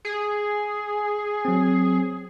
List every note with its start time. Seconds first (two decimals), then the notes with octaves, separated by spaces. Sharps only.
0.05 G#4
1.45 F#3 C4